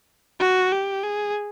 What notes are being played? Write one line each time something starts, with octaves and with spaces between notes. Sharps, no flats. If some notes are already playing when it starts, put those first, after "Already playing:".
F#4
G4
G#4